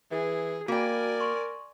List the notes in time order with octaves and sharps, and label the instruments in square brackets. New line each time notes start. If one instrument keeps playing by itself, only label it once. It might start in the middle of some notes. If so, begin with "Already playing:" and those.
[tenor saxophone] E3 [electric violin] G#4
[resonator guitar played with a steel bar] A#3 G5 [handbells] F#4 [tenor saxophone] A#4 [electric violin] D5 G#5
[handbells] C6 C#6